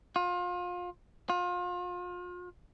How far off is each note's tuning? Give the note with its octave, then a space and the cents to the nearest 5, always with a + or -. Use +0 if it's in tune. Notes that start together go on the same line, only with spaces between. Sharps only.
F4 +30
F4 +35